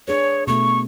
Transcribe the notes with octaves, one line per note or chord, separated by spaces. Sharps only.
D4 G#4 B4 C#5
B2 A3 C#6